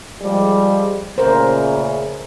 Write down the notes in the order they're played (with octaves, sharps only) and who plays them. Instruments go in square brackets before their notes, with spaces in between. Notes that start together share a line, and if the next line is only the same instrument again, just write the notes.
[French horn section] F3 G3 G#3
[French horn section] A#2 C#3 A3 [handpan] A#4 C5